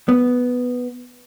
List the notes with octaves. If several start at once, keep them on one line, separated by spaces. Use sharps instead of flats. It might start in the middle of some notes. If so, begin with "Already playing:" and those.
B3